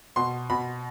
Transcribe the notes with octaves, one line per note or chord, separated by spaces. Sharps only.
B2 C6
B2 B5